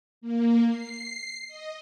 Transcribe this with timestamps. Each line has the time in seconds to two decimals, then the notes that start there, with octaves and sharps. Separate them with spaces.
0.21 A#3
0.68 C7
1.48 D#5